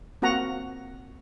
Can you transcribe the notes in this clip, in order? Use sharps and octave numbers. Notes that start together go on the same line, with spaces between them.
A#3 C4 F#4 F#5 A#5